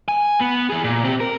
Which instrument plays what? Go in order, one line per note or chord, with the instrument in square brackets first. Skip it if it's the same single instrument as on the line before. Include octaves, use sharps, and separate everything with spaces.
[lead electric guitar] G#5
B3
E3 G#4
A#2
C4 G4
A#4